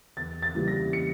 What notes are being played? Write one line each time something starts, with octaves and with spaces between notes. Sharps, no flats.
E2 A6
A6
C#3 E3 G3 A#3
A#6
C#7